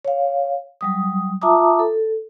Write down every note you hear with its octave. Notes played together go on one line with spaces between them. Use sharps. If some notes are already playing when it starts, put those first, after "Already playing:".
C#5 F5
F#3 G3 D#6
F4 E5 A5 A#5 D6 D#6
A4